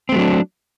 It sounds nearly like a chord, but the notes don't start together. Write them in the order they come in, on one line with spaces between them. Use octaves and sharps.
C4 A3 F#3 D4